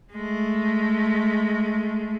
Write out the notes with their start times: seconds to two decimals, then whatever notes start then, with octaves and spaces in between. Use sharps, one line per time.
0.13 G#3 A3